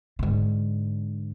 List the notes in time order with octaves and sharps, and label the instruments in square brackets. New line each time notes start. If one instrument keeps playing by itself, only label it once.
[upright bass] G#2 D3